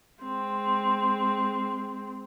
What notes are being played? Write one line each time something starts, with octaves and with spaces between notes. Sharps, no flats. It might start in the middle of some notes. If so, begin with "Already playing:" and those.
G#3 C4